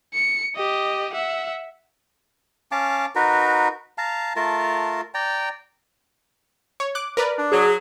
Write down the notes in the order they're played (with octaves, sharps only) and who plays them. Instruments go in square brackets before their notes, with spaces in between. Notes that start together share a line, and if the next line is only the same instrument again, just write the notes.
[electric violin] C#7
G4 D#5
E5 F#5
[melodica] C#4 F5 A5 D6
D#4 F#4 A#4 B4
F5 A5 A#5
A3 F4 A#4 A5
D5 G5 A#5
[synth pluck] C#5
D6 F#6
A#4 B4 D5
[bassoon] D4
[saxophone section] F#3 [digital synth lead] G#4